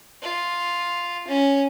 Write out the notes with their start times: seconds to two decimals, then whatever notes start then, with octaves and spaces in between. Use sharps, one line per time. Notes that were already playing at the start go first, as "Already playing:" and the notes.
0.22 F4
1.28 C#4